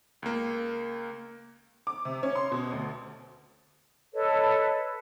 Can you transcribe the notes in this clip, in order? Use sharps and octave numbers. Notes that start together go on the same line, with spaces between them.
C#2 A#3
D6
C3
C#4
C6
B2
D2
A4 B4 C#5 D#5